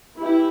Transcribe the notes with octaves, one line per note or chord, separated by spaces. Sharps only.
E3 G3 E4 G4